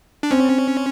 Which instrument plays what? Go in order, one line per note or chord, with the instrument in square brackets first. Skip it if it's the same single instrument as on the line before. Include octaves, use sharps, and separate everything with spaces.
[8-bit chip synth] D4
[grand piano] C4 [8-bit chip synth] C#4